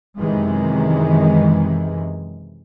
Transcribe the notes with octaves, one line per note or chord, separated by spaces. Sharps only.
F#2 C3 D#3 E3 G#3